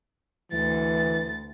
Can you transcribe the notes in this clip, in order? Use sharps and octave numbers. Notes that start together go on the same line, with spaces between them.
D2 E3 A6